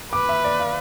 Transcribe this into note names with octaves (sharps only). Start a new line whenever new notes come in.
B4 D6
E5
D5
F5